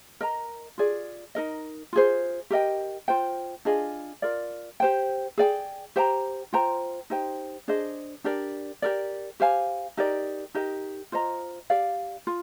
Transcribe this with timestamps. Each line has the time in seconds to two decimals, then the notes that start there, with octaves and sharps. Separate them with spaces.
0.21 A#4 D#5 A#5
0.78 F4 G#4 D5
1.35 D#4 A#4 D#5
1.93 F4 G#4 C5
2.50 G4 A#4 D#5 G5
3.08 F4 C5 G5
3.65 D4 F4 G#4 D#5
4.22 F4 A#4 D5
4.80 G4 C5 G5
5.38 G#4 D5 G5
5.96 G4 C5 G5 A#5
6.53 F4 C5 G5 A#5
7.10 D#4 G4 C5 G5
7.68 D4 G#4 C5 D#5
8.24 D4 G4 A#4 D5
8.82 G4 A#4 D5
9.40 G4 C5 F5 G#5
9.97 D#4 G4 A#4 D5
10.54 D#4 G4 A#4 D#5
11.12 F4 C5 D#5 A#5
11.70 G4 D5 F5
12.27 F4